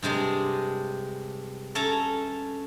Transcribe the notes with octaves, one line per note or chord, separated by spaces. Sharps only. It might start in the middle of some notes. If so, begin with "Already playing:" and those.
G2 C3 G#3 D4
C#4 A4 E5 A5 A#5